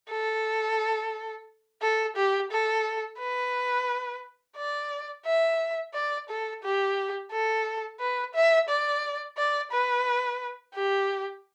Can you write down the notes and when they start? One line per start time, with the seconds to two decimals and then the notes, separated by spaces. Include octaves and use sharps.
0.11 A4
1.82 A4
2.16 G4
2.51 A4
3.19 B4
4.57 D5
5.26 E5
5.94 D5
6.29 A4
6.63 G4
7.32 A4
8.00 B4
8.34 E5
8.69 D5
9.37 D5
9.72 B4
10.75 G4